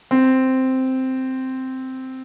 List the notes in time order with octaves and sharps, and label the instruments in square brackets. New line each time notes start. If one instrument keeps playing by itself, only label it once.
[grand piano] C4